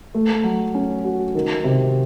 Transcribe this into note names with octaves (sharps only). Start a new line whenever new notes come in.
A3
F#3
C#4
F#4
D#3
C3